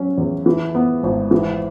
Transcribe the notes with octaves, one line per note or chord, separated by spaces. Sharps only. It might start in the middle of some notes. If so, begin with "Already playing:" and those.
Already playing: F#3 C#4
E2
E3
B3
G#1
E3